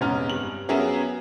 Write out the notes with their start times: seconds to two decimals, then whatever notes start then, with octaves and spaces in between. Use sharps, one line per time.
0.01 F1 G#2 B3 C#4 A#5 F6
0.30 G2 F#7
0.69 F#3 B3 C#4 G#4 A#4 E5